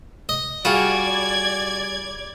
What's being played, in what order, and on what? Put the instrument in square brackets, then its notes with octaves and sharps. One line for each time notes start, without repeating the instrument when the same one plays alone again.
[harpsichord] D#5
[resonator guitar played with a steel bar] G3 F4 G#4 [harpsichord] F#4 [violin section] D5 G#6